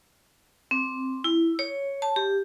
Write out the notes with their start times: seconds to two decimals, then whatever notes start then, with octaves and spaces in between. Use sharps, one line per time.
0.71 C4
1.24 E4
1.59 C#5
2.02 A5
2.16 G4